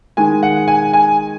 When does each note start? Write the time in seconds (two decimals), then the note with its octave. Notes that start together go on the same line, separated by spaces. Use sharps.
0.17 D#3 G#3 D#4 G#5
0.43 F#5
0.68 G#5
0.93 G#5